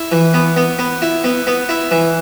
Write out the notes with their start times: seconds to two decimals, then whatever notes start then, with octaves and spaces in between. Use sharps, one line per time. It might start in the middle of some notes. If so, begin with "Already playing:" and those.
Already playing: E4
0.12 E3
0.34 B3
0.57 B3
0.79 B3
1.02 E4
1.24 B3
1.47 B3
1.69 E4
1.91 E3